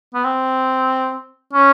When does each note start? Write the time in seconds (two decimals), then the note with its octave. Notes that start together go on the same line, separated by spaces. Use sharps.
0.14 B3
0.24 C4
1.53 C#4